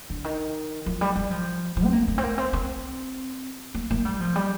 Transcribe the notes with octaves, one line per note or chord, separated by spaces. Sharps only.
D3
D#3
F3
G3
G3
F3
F3
C4
A#3
A3
C4
A#3
C4
C4
A#3
A#3
G3
F3
G3